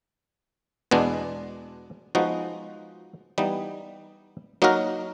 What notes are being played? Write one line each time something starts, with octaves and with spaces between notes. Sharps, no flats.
E2 B2 G#3 B3 D4
F3 G#3 B3 D#4 F#4
E3 G3 B3 D#4
F#3 A#3 D#4 F#4 A#4